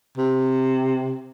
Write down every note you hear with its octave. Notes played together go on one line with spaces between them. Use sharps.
C3